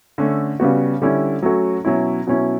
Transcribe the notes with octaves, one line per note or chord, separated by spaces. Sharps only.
D3 A3 C#4
C#3 G3 B3 F#4
D3 G3 C#4 E4
F#3 A3 C#4 F#4
B2 F#3 C#4 E4
B2 F#3 C#4 E4